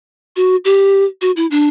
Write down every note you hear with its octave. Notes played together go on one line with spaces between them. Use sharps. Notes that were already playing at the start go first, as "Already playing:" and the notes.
F#4
G4
F#4
E4
D4